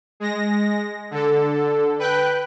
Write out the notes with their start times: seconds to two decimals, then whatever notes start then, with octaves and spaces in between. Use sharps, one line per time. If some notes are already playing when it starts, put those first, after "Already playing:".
0.20 G#3 A#6
1.11 D3 A4
1.99 B4 G5 F#6